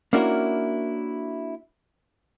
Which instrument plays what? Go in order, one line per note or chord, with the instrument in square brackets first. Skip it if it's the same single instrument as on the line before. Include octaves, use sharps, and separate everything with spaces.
[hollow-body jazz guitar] A#3 C#4 D4 E4 F#4 A#4